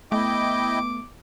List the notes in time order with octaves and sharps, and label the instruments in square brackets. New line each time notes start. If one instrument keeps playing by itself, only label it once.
[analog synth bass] A3 [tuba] B3 [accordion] E4 D#5 G5 [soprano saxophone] D6